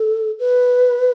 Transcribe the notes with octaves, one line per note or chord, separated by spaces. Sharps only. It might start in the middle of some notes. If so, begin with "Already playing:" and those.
Already playing: A4
B4